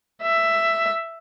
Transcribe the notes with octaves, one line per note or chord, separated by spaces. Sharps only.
E5